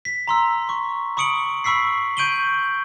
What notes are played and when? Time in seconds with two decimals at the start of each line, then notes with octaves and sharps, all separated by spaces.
0.05 B6
0.27 A#5 C6 E6
0.69 C#6
1.17 B5 C#6 D#6 C#7 D7 F#7
1.64 B5 C#6 E6 B6 C7
2.17 C#6 G6 D7 D#7 F#7 G7